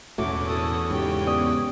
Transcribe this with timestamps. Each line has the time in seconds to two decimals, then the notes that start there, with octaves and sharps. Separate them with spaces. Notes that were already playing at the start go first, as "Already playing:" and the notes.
0.18 E1 E2 A2 A3 C#4 F#4 D6
0.47 A4 D#6
0.90 G#2 C#3 G4 G5
1.27 B3 D5 D#6